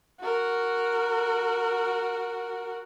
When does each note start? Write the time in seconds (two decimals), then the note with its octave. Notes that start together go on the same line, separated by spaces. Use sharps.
0.21 F#4 A#4